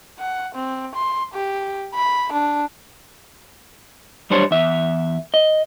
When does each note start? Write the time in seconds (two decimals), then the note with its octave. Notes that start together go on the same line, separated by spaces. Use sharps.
0.20 F#5
0.55 C4
0.95 C6
1.34 G4
1.95 B5
2.33 D4
4.30 F#2 G3 D4 C5 C#5 A5
4.51 E2 E5
5.34 D#5